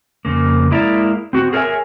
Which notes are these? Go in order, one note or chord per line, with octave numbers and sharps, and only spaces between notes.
F2 C#3 A#3
G#3 A#3 E4 D5 E5 A#5
C4 F#4
G#4 A#4 C#5 D#5 E5 G#5